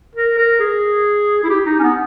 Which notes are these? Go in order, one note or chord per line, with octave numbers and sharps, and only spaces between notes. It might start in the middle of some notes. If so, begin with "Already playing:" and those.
A#4
A#4
G#4
E4
G4
D#4
C#4
B3